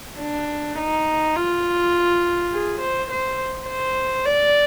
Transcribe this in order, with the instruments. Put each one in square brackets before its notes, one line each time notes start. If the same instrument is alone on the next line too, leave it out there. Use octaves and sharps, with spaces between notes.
[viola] D4
D#4
F4
G#4
C5
C5
C5
D5